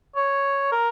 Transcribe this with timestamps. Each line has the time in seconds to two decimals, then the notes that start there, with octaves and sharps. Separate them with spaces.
0.16 C#5
0.72 A#4